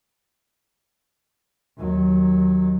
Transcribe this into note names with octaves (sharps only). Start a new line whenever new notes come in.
D#2 F#3